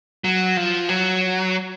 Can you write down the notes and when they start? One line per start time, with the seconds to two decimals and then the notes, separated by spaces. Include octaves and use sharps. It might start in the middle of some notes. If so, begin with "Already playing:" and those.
0.24 F#3
0.57 F3
0.89 F#3